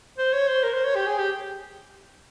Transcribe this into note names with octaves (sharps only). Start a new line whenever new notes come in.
C5
C#5
C5
A#4
C5
C#5
G4
G#4
G4